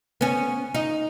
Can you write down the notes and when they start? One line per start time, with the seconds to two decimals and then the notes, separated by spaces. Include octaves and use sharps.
0.21 B3 C#4
0.74 D#4